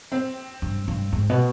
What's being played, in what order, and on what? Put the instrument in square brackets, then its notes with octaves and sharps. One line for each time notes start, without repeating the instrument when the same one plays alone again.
[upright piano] C4
[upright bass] G2
G2
G#2
B2